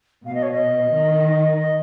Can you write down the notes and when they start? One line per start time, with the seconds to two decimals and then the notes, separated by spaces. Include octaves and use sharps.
0.25 B2 F5
0.34 D#5
0.42 C#5
0.52 D#5
0.92 D#3
1.58 D#5